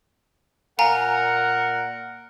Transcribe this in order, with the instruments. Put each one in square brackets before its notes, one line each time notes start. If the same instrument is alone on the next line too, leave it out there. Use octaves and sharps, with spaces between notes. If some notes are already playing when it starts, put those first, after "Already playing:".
[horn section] A#2 A#4 F#5 [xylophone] F5 G#5 A#5